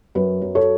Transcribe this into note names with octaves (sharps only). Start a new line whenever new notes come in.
F#2 F#4 B4
F#3
A4 C#5